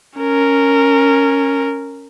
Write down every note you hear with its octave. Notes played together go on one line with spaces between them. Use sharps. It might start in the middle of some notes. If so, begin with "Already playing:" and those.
C#4 A#4